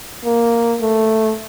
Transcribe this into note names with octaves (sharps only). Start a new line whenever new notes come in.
A#3
A3